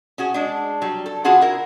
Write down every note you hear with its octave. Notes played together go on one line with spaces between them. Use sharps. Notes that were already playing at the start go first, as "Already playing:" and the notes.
C#4 F#4 G#4
G#3 D4
F#3 G3
A4
D3 B3 F4 F#4 G#4 F#5
E4 A#4